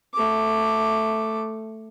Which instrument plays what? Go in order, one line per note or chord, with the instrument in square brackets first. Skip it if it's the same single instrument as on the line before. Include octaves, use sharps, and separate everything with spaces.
[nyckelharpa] A3 D6